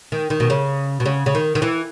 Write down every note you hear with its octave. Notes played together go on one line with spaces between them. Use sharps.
D#3
D#3
B2
C#3
B2
C#3
C#3
D#3
D#3
E3